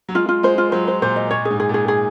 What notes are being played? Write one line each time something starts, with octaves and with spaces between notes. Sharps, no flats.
F#3
G#3 F4
F4
G#3 C5
F4
F#3 C5
C5
A#2 C5
D#5
A#2 C#5
G#4
G#2
G#4
A#2
G#4
G#4